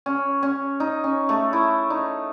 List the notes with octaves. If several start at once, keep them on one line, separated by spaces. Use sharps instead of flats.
C#4
C#4
D#4
C#4
A3
E4
D#4